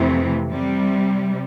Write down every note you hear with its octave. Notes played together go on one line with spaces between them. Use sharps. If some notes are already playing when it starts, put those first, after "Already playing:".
Already playing: F2 C3 E3 A3 C4
C3 G3